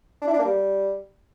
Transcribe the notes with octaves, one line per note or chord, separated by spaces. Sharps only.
D4
E4
D4
A#3
G3